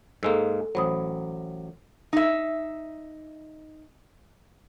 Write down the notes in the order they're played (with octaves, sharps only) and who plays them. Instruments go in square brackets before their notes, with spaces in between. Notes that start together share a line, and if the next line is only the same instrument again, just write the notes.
[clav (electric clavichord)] G#2 G#3 A#3 [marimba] A4 E6
[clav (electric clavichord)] A1 F#3 [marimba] C5 B5 D#6
[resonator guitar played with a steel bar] D#4 E5